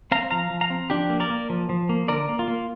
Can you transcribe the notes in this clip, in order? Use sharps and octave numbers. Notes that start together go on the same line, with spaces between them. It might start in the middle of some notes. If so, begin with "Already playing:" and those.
C4 F5 A#5
F3 F5 A#5
F3
F5 A#5
C4
F3 D4 G4
A#3
A#4 D5
A#3
F3
F3
A#3
D3 A#4 D5
A#3
F4
A#3